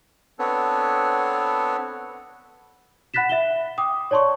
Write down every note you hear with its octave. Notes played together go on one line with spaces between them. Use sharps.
B3 C4 D4 A4 B4 C#5
F#5 B5 F#6 A6 B6 E7
E5 E7 G7
G5 D6 D#6
C#5 D5 A5 C6 C#6